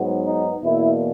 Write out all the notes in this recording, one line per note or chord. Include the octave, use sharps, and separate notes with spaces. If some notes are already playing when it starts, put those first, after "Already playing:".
Already playing: G#2 F#3 B3
D#4
E2 B2 A#3 E4